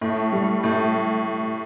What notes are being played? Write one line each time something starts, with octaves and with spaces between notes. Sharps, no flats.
A2
G3
A2